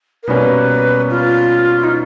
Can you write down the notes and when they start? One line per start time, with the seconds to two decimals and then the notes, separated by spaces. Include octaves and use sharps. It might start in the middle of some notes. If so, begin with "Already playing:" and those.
0.23 A#4
0.27 B2 G3 A#3 C#4 B4
1.10 F4
1.84 D#4